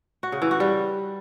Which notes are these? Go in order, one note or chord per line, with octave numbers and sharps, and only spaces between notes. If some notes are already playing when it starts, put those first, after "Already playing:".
F#4
C#3
E3
F#4
G3